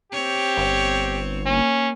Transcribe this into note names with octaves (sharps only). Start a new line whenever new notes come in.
C4 G4 C#5
G1
A#3 C#4